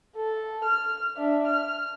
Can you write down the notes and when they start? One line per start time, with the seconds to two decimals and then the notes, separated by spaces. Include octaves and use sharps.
0.17 A4
0.64 F6
1.17 D4 E5
1.47 F6